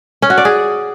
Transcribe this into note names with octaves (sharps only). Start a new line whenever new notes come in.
C#4
F#4
D5
G#4